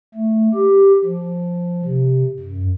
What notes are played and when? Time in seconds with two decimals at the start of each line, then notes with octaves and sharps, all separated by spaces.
0.14 A3
0.54 G4
1.05 F3
1.85 C3
2.40 F#2